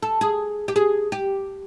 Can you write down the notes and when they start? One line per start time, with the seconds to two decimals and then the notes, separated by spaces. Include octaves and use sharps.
0.03 A4
0.21 G#4
0.68 G4
0.76 G#4
1.12 G4